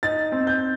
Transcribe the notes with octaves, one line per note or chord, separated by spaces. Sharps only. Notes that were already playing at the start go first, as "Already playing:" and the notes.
D#4 A6
C4
G6